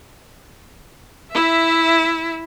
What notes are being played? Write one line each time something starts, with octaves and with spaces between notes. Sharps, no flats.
E4 E5